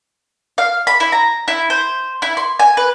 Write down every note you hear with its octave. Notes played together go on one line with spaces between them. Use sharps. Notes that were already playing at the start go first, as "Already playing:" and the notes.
F5
B5
E4
A#5
E4
C5
E4
C6
G#5
B4